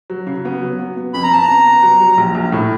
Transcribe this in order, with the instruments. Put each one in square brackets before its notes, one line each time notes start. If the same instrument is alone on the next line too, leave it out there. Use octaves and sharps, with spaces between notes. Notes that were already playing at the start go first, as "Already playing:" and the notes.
[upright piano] F#3
C#3
B3
F#3
B3
B3
[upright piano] F2 [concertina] B5
[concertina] A#5
[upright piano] B3 [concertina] A5
[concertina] A#5
[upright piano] C#3
B3
F#3
F#3
A#1
A#1
A2